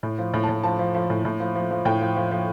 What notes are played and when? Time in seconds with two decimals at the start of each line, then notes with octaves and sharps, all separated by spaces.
0.03 A2
0.19 F3
0.34 A2
0.43 A5
0.49 A2
0.64 F3 A5
0.79 F3
0.94 F3
1.10 A2
1.25 A2
1.40 F3
1.56 F3
1.71 F3
1.85 A2 G5
2.01 F3
2.16 F3
2.31 F3